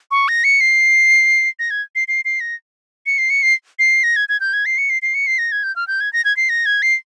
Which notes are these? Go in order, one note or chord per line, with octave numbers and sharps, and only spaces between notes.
C#6
A#6
C#7
C7
A#6
G#6
C7
C7
C7
A#6
C#7
C7
C#7
C7
C7
A#6
G#6
G#6
G6
G#6
C7
C#7
C7
C7
C#7
C7
A#6
G#6
G6
F6
G6
G#6
A#6
G#6
C7
A#6
G#6
C7